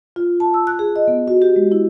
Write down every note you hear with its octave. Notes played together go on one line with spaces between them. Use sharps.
F4
A5
E6
F#6
G#4
D#5
B3
F#4
G4
G#3
E4